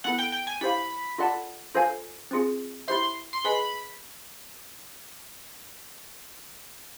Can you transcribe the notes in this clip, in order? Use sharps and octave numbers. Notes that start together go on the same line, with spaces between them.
B3 E4 A4 F#5
G5
G5
G#5
E4 G4 C5 F5 B5
F4 A4 D5 F#5 A5
F4 A4 C5 F5 G#5
C4 F4 G#4
E4 G4 C5 E5 C6
C6
G#4 B4 D#5 G#5 B5